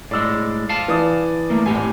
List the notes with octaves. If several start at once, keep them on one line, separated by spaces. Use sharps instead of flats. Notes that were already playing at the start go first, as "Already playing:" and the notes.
A2 G#3 D5 E6
F5 A5
E3 D5 D#6
A3 A#3
G#1 A2 G4 G#5